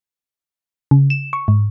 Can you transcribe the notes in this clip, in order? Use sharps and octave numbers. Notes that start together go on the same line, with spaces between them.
C#3
E7
C#6
G#2